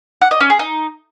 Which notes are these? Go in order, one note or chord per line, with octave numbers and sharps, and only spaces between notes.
F#5
D#5
C#4
G#4
D#4